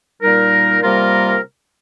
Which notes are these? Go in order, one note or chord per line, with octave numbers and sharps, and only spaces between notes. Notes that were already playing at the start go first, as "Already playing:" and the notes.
A#2 G3 D#4 A#4
C3 G3 A#3 F4 A#4